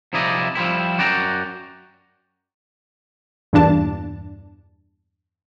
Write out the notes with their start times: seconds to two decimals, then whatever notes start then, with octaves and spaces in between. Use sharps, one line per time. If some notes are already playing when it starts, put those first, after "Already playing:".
0.13 C3 F3 D#4 E4 D5 D#5
0.55 F3 G3 C4 E4
0.98 F#2 F#4 D5 G5 A#5
3.53 E2 G2 A#2 D4 A5